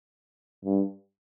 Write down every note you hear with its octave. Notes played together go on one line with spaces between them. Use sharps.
G2